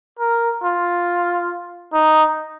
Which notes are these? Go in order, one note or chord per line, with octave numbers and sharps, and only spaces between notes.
A#4
F4
D#4